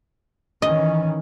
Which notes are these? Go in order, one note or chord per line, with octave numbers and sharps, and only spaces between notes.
D#3 E3 C#4 D#5